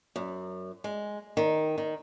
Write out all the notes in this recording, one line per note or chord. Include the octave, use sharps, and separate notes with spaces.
F#2
G#3
D#3
D#3